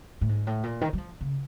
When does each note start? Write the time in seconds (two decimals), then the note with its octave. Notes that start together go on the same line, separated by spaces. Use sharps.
0.21 A2
0.29 G#2
0.47 A2
0.63 A#2
0.81 D#3
0.93 F#3
0.98 F3
1.21 C#3